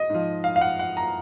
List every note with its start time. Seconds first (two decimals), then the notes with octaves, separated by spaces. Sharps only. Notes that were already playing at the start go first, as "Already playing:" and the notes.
Already playing: D#5
0.10 G#2 F3
0.44 F5
0.56 F5
0.61 F#5
0.79 F#5
0.97 A#5